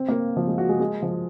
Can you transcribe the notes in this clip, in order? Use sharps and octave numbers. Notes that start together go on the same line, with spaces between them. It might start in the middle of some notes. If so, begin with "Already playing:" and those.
Already playing: C4
A#3
F3
G#3
F#4
G#3
G#3
F3